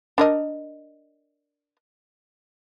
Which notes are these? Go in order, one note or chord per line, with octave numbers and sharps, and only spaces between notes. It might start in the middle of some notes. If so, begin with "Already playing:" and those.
D4 A#4 D#5